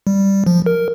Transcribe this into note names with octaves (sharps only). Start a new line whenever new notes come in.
G3
F3
A#4